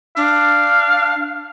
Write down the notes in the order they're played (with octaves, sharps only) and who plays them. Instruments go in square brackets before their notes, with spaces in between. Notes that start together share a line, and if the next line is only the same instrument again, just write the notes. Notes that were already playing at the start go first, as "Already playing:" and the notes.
[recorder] D4 [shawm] F5